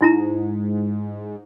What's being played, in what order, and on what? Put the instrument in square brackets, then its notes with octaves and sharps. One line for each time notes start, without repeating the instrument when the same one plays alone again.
[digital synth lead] G#2 [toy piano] D#4 E4 A#5